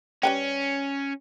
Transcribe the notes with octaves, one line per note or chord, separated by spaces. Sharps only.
G3 C#4 B4 G5